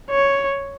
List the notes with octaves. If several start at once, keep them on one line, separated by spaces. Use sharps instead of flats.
C#5